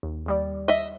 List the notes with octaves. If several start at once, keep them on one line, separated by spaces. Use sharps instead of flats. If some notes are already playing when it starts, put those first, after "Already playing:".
D#2
D#2 G3 D5
D#5 E5